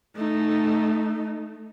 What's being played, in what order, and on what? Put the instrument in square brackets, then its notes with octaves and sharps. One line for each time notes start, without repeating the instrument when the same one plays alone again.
[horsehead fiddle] A3 D#4